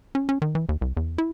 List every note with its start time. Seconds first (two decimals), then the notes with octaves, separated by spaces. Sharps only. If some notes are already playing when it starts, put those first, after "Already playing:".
0.15 C#4
0.29 C#4
0.42 D#3
0.55 E3
0.69 D#2
0.81 C2
0.97 E2
1.18 E4